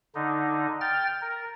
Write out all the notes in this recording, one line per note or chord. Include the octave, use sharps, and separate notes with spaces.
D3 D#4
G5 F6 A6
A#4